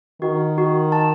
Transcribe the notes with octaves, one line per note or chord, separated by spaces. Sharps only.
D#3 F#4
F#4
A5